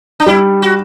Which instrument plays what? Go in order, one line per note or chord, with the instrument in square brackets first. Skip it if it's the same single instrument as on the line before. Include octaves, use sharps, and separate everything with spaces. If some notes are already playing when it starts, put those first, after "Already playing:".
[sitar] D4
[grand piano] G3 [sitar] E4
[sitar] F#4